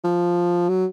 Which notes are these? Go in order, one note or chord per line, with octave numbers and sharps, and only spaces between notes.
F3
F#3